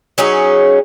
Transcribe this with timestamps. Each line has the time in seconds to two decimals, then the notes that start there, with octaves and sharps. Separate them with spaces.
0.18 F#3 C#4 D#4 G#4